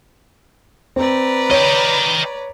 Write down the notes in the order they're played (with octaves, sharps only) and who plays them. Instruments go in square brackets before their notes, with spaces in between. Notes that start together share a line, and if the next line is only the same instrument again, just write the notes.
[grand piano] C4 [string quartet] B4 D5 A#5
[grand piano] C#5 [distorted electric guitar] D#5 G5